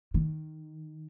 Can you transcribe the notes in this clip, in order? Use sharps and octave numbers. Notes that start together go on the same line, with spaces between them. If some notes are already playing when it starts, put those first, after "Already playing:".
D#3